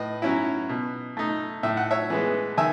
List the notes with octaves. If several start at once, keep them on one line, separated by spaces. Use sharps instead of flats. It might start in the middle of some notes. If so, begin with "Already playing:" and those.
Already playing: A2 B4 D#5
F#3 C#4 E4
B2
A3 D#4
A2 E5
F#5
C#5 E5
E3 G#3 B3
D#3 E5 G#5